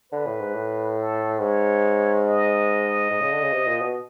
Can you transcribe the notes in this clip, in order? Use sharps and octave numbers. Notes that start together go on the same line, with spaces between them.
D3 B4
A2
G#2
A2
A4
G#2 C#5
D#5
G#2
C#3
D3
C#3
C3
A#2
B2